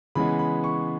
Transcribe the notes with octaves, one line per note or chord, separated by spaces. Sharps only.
C#3 E3 G#3 B3 B5
B5
C#6